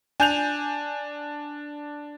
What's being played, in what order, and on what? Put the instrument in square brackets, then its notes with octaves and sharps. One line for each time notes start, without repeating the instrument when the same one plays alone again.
[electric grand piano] D4 [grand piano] G#5 G6 F7